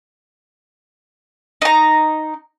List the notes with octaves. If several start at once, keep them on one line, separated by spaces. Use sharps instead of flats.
D#4 A#5